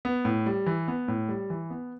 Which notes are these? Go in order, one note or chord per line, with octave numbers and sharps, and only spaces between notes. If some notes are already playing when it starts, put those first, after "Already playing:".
B3
A2
G3
E3
B3
A2
G3
E3
B3